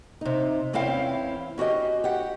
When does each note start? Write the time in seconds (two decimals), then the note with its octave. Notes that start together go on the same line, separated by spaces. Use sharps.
0.21 C3 D#4
0.73 E2 C4 C#4 E4 F5 G5
1.58 C#4 F#4 G4 D#5
2.04 G4 F#5